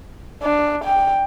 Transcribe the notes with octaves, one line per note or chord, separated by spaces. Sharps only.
D4
G5